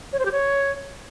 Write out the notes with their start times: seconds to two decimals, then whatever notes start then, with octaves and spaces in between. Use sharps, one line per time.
0.13 C#5
0.19 C5
0.25 G4
0.32 C#5